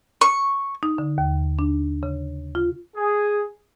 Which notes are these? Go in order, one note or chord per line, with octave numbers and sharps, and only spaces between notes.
C#6
D#4
D3
D#2
D4
C#3
F4
G#4